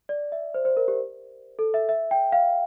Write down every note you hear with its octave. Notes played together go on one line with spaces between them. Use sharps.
D5
E5
C5
C5
A#4
G4
A4
E5
E5
G5
F5